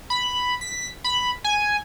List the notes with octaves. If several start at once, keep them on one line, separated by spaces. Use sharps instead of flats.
B5
B6
B5
G#5